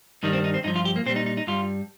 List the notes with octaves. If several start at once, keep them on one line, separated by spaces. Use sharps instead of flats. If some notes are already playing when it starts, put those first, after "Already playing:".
G2 D#3 G3 D#4
C4
D#4
C4
G2 F3 D#4
F4
G4
A#3
A#2 G3 C4
D#4
D#4
D#4
G2 G3 F4